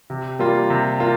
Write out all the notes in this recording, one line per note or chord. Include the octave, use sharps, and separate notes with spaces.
C3
G3 A#3 F4
C3
A#3 F4